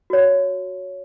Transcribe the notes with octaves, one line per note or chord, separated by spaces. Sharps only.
F#4 C#5